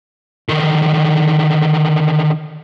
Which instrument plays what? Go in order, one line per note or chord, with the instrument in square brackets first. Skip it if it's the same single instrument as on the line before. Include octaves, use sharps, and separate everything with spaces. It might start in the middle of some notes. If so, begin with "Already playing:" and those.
[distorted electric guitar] D3 D#3